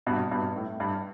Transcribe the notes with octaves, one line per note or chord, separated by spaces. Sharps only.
G2 B2
G2 B2
A2
G2